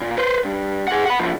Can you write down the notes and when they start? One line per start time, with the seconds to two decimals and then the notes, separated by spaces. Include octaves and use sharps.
0.01 A#2
0.18 B4 C5
0.45 G2
0.88 G#4 F#5
1.06 F#5 B5
1.20 B1 F3